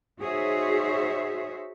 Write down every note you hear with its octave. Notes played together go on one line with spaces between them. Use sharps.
D#4 F#4 G#4 C5 C#5 E5